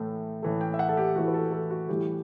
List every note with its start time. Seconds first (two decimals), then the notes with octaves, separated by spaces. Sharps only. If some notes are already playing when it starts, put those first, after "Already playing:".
Already playing: A2 E3 A3
0.43 A2 E3 A3
0.61 G5
0.74 E5
0.79 F#5
0.89 A4
0.97 G4
1.16 A2 E3 A3 F#4
1.27 B4
1.34 A4
1.52 A4
1.71 F#4
1.89 A2 E3 G3 G4